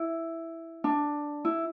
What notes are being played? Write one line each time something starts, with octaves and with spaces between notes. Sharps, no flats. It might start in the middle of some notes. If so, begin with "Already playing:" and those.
Already playing: E4
D4
E4